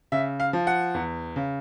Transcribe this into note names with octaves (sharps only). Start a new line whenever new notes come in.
C#3 E5
F5
F3
F#5
E2
C#3